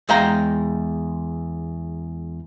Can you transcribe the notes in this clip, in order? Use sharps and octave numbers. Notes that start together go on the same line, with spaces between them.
E2 G#3 F5 G5 A#5